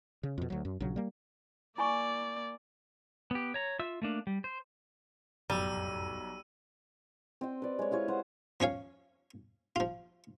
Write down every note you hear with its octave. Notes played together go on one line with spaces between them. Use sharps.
C#3
F2 B2
D2 F#3
F#2
A#1 C#3 F#3
G3 A#3
A#3 E4 D5 G#5 C#6
B3 G4
C#5 A#5
F4 E5 E6
A3 A#3 D4
G3
C5
F1 B1 F#2 A2 G3 E6 D#7
C4 D#5 G5
B4 D5
G#3 C#5
E4 F4 G#4 C#5
C5 F#5
F3 C#4 C#5 F5
F3 F4